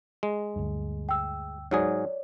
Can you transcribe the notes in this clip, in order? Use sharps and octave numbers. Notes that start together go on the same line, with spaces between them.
G#3
D2 G2
G5 E6
G#2 F#3 G#4 C#5 D5